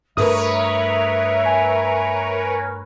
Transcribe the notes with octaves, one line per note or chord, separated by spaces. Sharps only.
G2 A3 A#4 B4 C#5 E5 D#6
G#5